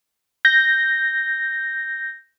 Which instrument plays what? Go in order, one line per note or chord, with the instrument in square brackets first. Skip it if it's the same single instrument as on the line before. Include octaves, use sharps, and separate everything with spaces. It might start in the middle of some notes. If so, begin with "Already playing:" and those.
[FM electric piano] G6 A#6